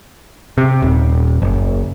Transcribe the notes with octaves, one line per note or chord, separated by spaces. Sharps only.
C3
D#1
F#1